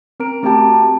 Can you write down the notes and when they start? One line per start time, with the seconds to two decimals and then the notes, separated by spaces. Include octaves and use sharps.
0.20 C4 A#4 A#5 D7
0.43 A3 C4 F#4 G4 G5 A5